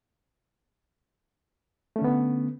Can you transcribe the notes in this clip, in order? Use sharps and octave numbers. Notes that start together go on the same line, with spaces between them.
D3 A3 B3 C#4